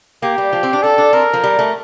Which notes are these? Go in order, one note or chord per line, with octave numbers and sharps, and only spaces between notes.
A#3 G4
G3
F3
C4
D4
D4 A4
D4
C4 A#4
F3
G3
A3